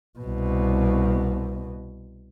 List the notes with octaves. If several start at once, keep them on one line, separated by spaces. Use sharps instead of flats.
C2 B2